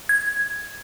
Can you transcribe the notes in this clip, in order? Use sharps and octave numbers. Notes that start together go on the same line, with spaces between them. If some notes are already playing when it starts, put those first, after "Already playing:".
G#6